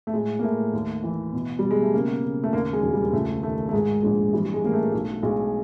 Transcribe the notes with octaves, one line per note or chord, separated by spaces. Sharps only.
A3
A2 G#3
A#3
A2 A3
D#2
E3
B2
B2 G3
G#3
A3
C#3 A#3
C#3
A3
D#2 A#3
G#3
E1
G3
C#2 A3
D#3 A3
A3
G#2 G#3
A#1 G#3
E3 G3
G#3
A1 A#3
A3
B1 A3
B1 G#3